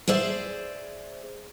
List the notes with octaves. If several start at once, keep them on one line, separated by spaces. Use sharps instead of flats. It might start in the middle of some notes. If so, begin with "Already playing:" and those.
G#4 C5 D5 E5